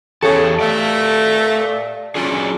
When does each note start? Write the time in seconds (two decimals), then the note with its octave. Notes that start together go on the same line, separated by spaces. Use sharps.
0.22 E2 G2 C#3 G4 A4 A5 C#6
0.59 A3 D5 F5
2.15 F#3 C#4 D4 F4 G#4